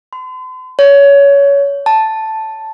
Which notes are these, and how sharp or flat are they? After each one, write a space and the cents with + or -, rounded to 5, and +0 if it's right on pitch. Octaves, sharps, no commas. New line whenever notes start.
C6 -45
C#5 +20
A5 +0